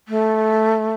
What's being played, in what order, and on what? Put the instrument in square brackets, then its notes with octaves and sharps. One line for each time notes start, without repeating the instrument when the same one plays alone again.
[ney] A3